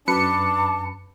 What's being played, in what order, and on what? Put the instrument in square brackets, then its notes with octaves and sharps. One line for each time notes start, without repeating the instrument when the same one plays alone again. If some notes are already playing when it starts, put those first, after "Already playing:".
[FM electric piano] F#2 B4 C#7 [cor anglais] D4 [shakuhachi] A5